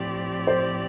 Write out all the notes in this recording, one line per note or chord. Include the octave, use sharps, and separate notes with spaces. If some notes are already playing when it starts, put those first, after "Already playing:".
Already playing: A2 F3 C4 G4 D5
C5